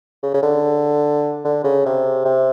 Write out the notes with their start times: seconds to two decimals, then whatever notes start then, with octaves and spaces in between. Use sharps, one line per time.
0.23 C#3
0.34 C#3
0.42 D3
1.45 D3
1.64 C#3
1.86 C3
2.25 C3